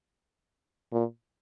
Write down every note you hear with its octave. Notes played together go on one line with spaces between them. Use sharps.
A#2